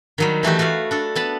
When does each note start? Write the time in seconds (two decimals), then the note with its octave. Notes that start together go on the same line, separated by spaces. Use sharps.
0.18 D#3 F#3 G3
0.43 E3 A3 F#4 G4
0.59 F#4 A4 B4 F5
0.91 D4 A4
1.15 B3 A5 B5